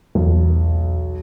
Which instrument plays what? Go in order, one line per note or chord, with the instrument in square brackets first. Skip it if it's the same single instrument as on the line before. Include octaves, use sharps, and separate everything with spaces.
[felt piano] B1 [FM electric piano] E2